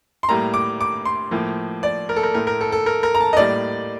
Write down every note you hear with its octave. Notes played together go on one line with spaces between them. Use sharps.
C6
A2 G3 A#3 A#5
D6
D6
C6
A2 F3 A#3
D5
A#4
A4
A#4
A2 A3 A#4
A#4
A4
A4
A#4
A#4
A#5
A5
D#5
A2 G3 A#3 D5